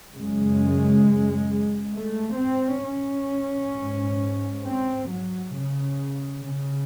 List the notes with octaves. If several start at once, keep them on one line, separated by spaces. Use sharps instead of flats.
F#2 C#3 G#3
A3
C4
C#4
G#2
C4
F#3
C#3
C#3